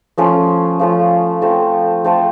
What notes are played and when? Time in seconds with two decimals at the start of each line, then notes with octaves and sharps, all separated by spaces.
0.18 F3 A3 C#4 F4
0.79 F3 A3 C#4 F4
1.42 A3 C4 F4 A4
2.04 A3 C4 F4 A4